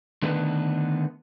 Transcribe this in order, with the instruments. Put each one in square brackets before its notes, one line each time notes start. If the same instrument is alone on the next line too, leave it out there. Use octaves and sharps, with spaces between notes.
[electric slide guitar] D3 D#3 A3 B3 D4 B4